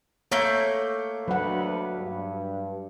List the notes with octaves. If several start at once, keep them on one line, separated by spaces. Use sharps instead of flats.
A3 A#3 C#5 G6
D2 F#3 B4 F#5
G2